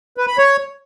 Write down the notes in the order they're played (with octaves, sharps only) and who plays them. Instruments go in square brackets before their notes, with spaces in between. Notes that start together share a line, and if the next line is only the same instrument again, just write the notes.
[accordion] B4
B5
C#5